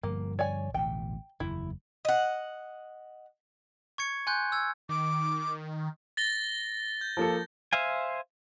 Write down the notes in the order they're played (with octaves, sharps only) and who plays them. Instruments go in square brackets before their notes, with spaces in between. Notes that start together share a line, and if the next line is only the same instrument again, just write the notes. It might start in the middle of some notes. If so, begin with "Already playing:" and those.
[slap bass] G2 D3 F3 [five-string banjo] A#3
[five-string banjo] C#5 D5 G#5
[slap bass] A1 D2 B2 [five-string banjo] G5
[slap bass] F#1 E2 [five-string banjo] E4
[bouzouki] D#5 F#5
[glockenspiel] C#6 G#6 C#7
G#5 C6 F#6 G6
E6 G#6
[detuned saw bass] D#3 [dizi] D6
[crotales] A6 A#6 G7
G6
[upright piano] F3 A#3 A4
[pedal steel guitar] C5 E5 F5 G#5